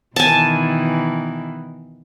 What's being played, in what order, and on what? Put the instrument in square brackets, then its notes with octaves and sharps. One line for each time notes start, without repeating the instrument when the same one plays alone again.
[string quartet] B2 D#3 E3 [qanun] G#5 A5